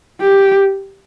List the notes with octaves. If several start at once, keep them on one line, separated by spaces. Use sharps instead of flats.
G4